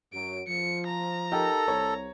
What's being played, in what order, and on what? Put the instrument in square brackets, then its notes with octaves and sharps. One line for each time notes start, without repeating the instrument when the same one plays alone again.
[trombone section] F#2 F#3 [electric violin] D7
[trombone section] F3 [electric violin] C#7
[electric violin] A#5
[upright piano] D#4 G4 A#4 [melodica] A4
[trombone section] C2 [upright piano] C#5